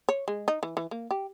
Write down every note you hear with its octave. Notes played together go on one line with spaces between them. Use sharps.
C#5
G#3
D#4
E3
E3
A#3
G4